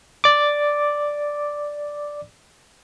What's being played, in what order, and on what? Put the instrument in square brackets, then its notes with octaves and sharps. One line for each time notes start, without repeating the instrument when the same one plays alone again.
[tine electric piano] D5 D6